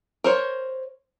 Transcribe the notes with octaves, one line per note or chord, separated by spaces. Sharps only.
A#4 C5 C#5